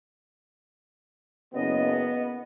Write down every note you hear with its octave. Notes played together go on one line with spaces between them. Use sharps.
F#1 B3 D#5